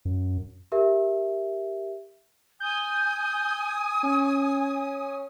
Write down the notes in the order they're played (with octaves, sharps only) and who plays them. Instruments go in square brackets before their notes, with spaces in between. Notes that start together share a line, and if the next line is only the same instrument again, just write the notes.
[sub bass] F#2
[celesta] G4 A#4 E5
[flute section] G#5 D#6 [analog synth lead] G6
[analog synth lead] C#4